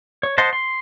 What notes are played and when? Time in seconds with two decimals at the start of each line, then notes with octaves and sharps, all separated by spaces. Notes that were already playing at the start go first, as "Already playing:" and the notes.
0.23 C#5
0.38 C5 D#5 F#5 A5 C6
0.53 C6